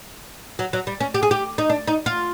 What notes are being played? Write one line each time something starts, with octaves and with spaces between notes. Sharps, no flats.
F#3
F#3
G3
C#4
G4
G#4
G4
D#4
D4
D#4
F4